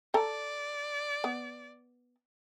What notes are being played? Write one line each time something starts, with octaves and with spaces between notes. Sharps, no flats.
A4 D5 A5 A#5
B3